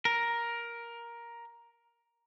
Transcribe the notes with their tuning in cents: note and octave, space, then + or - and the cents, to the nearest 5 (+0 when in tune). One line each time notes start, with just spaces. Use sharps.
A#4 +10